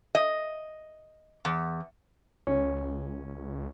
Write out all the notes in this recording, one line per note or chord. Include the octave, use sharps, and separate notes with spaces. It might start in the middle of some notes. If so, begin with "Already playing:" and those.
D#5
E2
C#2 C#4